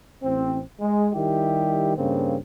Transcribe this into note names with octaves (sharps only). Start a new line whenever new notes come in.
A1 C4
G#3
D#3 G3 E4 G4
G2 C#3 A#3 C4